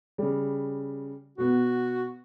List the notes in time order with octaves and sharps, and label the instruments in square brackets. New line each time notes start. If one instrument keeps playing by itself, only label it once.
[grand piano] C#3 G3
[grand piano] B2 B3 [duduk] F#4